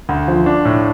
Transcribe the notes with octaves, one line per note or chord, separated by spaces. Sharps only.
D2
F3
D4
A2